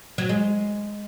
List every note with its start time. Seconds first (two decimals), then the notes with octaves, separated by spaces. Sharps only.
0.18 F#3
0.29 G#3